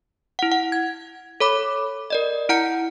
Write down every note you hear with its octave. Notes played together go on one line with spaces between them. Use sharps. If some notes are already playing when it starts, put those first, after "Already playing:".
E4 F#5
F#5
G#6
A4 C#5 B5 D6
A#4 D5 D#5
E4 F#5 A#5 G6 C#7